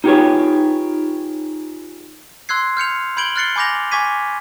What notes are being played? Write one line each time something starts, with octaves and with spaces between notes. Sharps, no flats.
D#4 F4 G4 G#4 B4 C#5
C6 E6 F#6 G#6 C7
F6 G6 C#7 F7
B5 G6 G#6 D7 F#7 G7
F6 F#6 A6 C7 C#7 G7
G#5 B5 D6 G6 A#6 F7
G#5 C#6 D6 G#6 B6 D#7